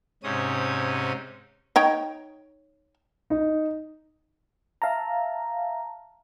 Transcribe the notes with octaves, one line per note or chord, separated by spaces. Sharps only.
G#2 C3 C#4 D#6
D#4 C#5 G5
D#4
E5 F5 A5 A#5